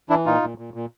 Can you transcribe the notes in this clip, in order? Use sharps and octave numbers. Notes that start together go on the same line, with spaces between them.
E3 D4 E4
A#2 D#4 F4
A#2
A#2
A#2